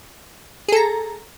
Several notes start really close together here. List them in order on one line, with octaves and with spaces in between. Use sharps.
G#4 A4 A#5